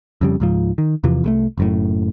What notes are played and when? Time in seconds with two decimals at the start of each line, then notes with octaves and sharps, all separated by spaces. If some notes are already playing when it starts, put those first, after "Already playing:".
0.21 F2 C#3 G3
0.40 C#2 G#2 F3
0.78 D#3
1.04 E2 C3 E3 F3
1.24 C2 G#3 A3
1.58 F#1 F#2 A2